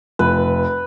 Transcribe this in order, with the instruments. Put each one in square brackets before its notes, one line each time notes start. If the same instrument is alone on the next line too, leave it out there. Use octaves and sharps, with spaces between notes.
[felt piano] F1 [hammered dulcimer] B4